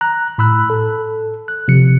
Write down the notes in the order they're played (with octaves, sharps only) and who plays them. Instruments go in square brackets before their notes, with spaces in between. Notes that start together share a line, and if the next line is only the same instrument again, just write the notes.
[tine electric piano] A#5 F#6
A2 B5 E6 F#6
A4
F#6
C3 F3 C#7